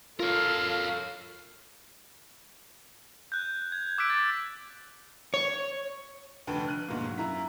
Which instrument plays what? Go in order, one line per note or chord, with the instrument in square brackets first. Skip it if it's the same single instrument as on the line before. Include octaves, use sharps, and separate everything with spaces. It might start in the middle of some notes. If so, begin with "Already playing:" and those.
[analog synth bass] F4 [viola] A4 F5 [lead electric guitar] A#4 C#5
[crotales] F#6 G6
G#6
D6 E6 F#6 G6 B6 D7
A6
[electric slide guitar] C#5
[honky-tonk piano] F1 D2 D4 B4 G5 A5
F6 F#6 D#7
D2 G#2 B2 D#3 A#3
F#3
F#2 E4 A#5 B6